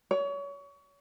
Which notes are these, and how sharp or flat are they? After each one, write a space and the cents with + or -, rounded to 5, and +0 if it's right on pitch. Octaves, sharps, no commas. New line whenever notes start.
C#5 +30